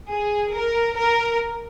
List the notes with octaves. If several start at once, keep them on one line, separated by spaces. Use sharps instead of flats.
G#4
A#4
A#4